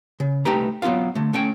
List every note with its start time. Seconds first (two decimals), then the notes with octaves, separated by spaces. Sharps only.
0.20 C#3
0.45 C2 A3 D#4 G4 B4 A#5
0.82 F#3 B3 C4 F4 F5
1.15 D3 A3
1.33 A3 C#4 C#5 G5